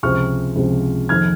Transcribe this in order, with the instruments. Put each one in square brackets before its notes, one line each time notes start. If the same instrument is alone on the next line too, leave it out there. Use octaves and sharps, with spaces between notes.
[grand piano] C#2 C3 F3 C4 C#6 F6
C#2 C3 F3 C4
F2 D#3 A#3 F6 G#6